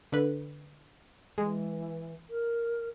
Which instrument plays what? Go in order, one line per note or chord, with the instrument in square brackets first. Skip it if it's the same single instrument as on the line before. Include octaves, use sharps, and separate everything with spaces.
[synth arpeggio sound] D3 B4
[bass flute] E3 [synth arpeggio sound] G#3
[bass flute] A#4